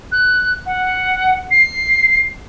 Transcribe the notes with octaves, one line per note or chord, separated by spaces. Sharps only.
F#6
F#5
C7